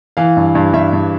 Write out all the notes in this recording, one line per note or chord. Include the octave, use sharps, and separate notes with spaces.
E3 F5
G2
G2
G2 E5
G2